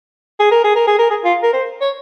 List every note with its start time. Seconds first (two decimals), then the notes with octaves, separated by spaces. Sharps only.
0.40 G#4
0.51 A#4
0.64 G#4
0.75 A#4
0.87 G#4
0.99 A#4
1.10 G#4
1.24 F4
1.43 A#4
1.53 C5
1.81 C#5